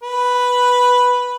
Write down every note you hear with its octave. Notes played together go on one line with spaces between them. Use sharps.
B4